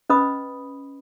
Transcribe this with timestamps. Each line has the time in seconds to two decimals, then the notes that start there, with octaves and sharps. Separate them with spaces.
0.09 C#4 B4 D#5 B5 D#6